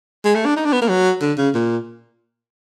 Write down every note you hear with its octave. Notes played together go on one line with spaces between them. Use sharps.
G#3
A3
D4
D#4
D4
B3
A#3
F#3
D3
C#3
A#2